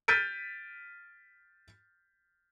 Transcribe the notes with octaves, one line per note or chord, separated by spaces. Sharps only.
F6 G6 A6 B6 D7 D#7